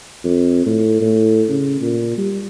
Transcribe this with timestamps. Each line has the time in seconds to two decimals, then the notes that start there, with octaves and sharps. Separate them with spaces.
0.24 F2
0.66 A2
1.01 A2
1.49 C#3
1.81 A#2
2.18 G3